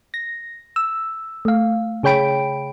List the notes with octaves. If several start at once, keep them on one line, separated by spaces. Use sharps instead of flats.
A#6
E6
A3 F5
C#3 G#4 C#5 G5 B5 D7